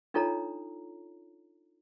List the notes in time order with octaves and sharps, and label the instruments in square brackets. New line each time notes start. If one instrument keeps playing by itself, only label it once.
[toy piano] D4 D#4 F4 A4 C#5 A#5